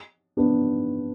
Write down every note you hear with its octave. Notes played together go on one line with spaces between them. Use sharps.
B3 D4